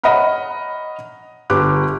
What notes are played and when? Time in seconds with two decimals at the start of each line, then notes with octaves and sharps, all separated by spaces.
0.04 C#5 D#5 F#5 A#5 B5 F6
1.50 G1 G4 D6 F#6